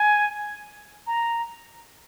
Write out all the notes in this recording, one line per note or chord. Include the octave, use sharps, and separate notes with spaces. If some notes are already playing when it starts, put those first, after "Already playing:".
Already playing: G#5
A#5